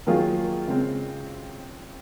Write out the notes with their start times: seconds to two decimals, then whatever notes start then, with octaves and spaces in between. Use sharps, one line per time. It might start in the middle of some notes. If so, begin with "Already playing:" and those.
0.06 D#3 F#3 A#3 F4 G#4
0.68 C#3 G#3 C4